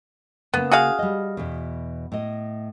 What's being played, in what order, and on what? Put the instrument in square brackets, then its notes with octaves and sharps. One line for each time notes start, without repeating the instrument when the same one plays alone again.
[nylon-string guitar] C#3 A#3 [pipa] B3
[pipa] F#4 G#4 F5
[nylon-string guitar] G3 D#5
E2 B2
A2 D#5